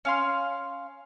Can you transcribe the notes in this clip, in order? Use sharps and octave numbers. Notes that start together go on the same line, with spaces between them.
C#4 F5 C6